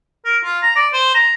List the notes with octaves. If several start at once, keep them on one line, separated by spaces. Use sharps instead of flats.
A#4
F4
A#5
D5
C5
A#5